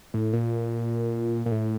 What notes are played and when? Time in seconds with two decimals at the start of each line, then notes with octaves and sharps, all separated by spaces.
0.14 A2
0.33 A#2
1.46 A#2
1.52 A2